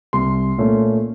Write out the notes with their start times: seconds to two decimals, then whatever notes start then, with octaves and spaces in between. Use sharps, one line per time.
0.13 C2 C6
0.58 A#2 A3 C#4